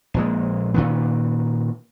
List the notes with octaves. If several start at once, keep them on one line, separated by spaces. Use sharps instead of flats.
A#1 A#2 G#3
A#2 D#3 B3